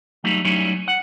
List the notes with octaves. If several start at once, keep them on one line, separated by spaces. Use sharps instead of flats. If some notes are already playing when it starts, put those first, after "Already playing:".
F#3 G3 A3 D#4
F#3 G3 A3 C#4 D#4 E4
F#5